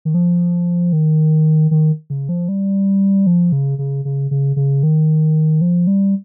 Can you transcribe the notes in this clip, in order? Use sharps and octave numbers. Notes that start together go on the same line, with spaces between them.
D#3
F3
D#3
D#3
C#3
F3
G3
F3
C#3
C#3
C#3
C#3
C#3
D#3
F3
G3